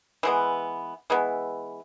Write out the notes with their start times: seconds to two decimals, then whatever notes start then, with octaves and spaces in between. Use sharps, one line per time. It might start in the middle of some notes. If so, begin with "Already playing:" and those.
0.23 E3 G#3 B3
1.10 E3 G#3 B3